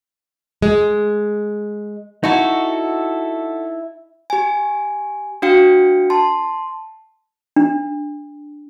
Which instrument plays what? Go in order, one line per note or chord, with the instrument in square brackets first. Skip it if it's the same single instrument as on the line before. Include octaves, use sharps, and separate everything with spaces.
[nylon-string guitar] G#3
[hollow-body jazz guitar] D#4 E4 [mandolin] F#4 A4
[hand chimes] G4 G#5
D4 F#4 F5 G5 C#7
A5 C6
[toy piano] D4